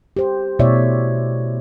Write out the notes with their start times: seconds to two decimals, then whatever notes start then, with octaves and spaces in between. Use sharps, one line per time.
0.17 G4 C5
0.59 B2 A3 E4 C#5 D5 E5